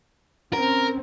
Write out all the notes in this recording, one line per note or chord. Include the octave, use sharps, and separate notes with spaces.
C4 C#4 A#4